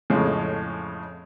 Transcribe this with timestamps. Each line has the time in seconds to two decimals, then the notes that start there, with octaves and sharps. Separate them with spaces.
0.10 F2 A2 C#3 G#3